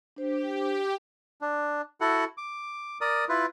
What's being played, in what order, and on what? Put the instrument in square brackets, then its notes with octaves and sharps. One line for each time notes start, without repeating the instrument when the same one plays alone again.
[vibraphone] D4 C5 [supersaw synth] G4
[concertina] D4
E4 F#4 A4 F#5
D6
A#4 D5 D#6
E4 F4 B4